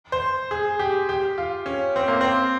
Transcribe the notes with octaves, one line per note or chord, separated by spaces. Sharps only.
C5
G#4
G4
G4
F4
C#4
C4
A#3
C4